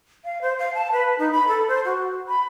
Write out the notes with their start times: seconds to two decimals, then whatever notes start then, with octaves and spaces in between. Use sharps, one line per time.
0.24 F5
0.41 C5
0.59 F5
0.74 A5
0.92 B4
1.18 D#4
1.32 B5
1.48 A4
1.68 C5
1.85 F#4
2.28 B5